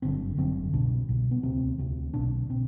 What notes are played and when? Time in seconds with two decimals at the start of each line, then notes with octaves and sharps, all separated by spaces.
0.02 G1 F#2 D3 C4
0.37 G1 F#2 D3 C4
0.73 C2 B2 D4
1.09 C2 B2
1.31 B3
1.43 D2 C3 C4
1.79 D2 C3
2.14 B1 B2 D4
2.49 B2 C4